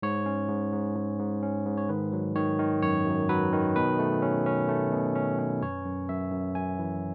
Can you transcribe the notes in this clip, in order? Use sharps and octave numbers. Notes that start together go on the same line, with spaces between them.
G#2 C#5
C#4
G#2
G#2
G#2
G#2
C#4
G#2
C#5
D#3 B4
F#3
D#3 C#5
D#3
F#2 C#5
F#2
F#3 B4
D#3
B2 B4
A3
C#4
C#4
A3
B2
C#4
C#4
F#2 C#5
F#2
F#2 E5
F#2
F#2 G#5
E3